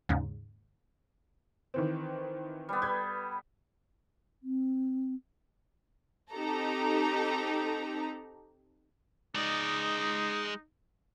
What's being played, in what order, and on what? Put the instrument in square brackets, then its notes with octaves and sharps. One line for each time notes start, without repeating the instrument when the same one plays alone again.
[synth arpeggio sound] D#2 G#2 C#3
[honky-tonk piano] D#3 E3 C4
[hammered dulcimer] G3 B3
[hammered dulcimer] B4 [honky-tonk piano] G6 G#6
[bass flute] C4
[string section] C4 D#4 G4 A4 A#5
[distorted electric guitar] G#3 D5 [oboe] D#4